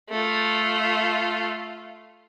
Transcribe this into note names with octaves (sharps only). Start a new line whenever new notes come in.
A3 F4